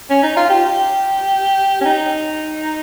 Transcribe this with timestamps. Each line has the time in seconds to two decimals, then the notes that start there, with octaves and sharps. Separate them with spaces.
0.10 C#4
0.23 D#4
0.37 F4
0.50 G4
1.81 C#4
1.85 D#4